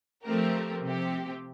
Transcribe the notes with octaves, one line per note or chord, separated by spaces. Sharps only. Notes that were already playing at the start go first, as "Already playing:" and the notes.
F3 A3 C4 G4 A#4
C3 F3 C4 G4